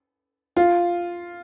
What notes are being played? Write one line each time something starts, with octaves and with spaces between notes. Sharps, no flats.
F4